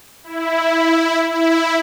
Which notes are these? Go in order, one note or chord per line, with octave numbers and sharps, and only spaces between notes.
E4
E4